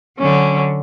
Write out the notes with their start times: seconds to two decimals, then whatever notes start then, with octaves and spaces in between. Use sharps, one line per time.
0.18 D3 F#3 C#4